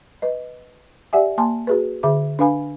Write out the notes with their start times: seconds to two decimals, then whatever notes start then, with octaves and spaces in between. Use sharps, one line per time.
0.22 B4 D#5
1.13 G4 D5 E5 F#5 G#5
1.38 A#3 G#5 A5 C6
1.67 F#4 G#4 B4
2.03 D3 G#4 E5 D6
2.39 D4 B4 F5 G#5 B5